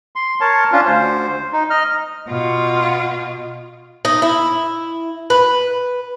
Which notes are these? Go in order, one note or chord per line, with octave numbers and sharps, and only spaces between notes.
C6
A#4 C#5 A5
C#4 D4 F4
D2 C5
D#4
D#5 F6
B2 F4
D#4
E4
B4